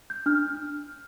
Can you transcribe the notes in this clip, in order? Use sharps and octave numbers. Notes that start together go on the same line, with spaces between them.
G6
D4 F6